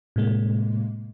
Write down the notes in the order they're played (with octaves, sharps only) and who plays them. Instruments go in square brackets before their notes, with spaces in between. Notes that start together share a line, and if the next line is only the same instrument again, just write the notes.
[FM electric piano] A2 C3 G#3 A#3